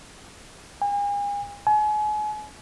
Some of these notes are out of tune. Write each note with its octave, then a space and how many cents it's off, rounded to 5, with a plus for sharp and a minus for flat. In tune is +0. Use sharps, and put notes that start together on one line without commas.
G#5 -40
G#5 +35